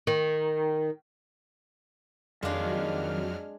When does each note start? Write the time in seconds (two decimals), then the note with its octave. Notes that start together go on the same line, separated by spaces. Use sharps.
0.07 D#3
2.43 F2 D#3 F#3 G#3 D4 F5 F6